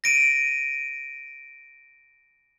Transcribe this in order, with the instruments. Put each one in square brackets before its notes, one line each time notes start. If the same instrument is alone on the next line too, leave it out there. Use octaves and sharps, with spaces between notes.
[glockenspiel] A#6 D7 D#7